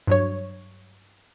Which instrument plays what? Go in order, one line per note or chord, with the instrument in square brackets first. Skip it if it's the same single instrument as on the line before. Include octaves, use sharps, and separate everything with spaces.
[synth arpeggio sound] G2 F#3 C#5